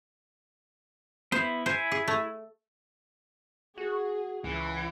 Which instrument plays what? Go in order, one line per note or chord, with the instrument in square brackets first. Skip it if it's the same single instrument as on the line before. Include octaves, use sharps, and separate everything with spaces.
[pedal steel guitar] B3 E4 [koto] C5
[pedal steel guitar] E4 G#5 [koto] C5
[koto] G#4
A3
[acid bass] F#4 [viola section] G#4
[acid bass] C#2 [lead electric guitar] E3